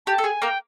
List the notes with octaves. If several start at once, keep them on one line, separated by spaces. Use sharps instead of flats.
G4 A5
A4
G#4 G#5
A#3 A#4 G5